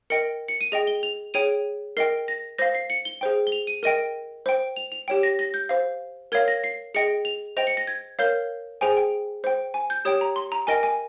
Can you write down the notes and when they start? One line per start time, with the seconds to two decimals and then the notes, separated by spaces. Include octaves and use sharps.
0.10 A#4 D#5 G5 C#7
0.48 C#7
0.61 D#7
0.72 G#4 D#5 G5 F7
0.87 G7
1.03 F7
1.34 G#4 C#5 G5 D#7
1.97 A#4 D#5 G5 C7
2.28 A#6
2.58 C5 F5 A#6
2.74 C7
2.90 C#7
3.05 G7
3.21 G#4 C5 G5
3.47 G7
3.52 F7
3.67 D#7
3.83 A#4 D#5 G5 D#7
4.46 C5 G5
4.76 F7
4.92 F7
5.08 G4 C#5 G5
5.23 A#6
5.39 A#6
5.54 G6
5.69 C5 F5
6.32 A#4 C#5 F5 G#6
6.48 A#6
6.64 C7
6.95 G#4 D#5 G5 C#7
7.25 F7
7.57 C5 D#5 G5 F7
7.67 C#7
7.77 A#6
7.87 G#6
8.19 A#4 C#5 F5 G6
8.81 G#4 C5 G5 G#5
8.97 G5
9.44 C5 G5
9.74 G#5
9.90 G6
10.05 G4 C#5 G5 D#6
10.21 A#5
10.36 C6
10.52 A#5
10.67 A#4 D#5 G5 G#5
10.83 G#5